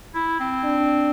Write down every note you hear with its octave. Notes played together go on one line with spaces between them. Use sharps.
E4
C4
D4